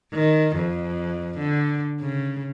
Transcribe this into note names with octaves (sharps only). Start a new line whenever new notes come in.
D#3
F2
D3
C#3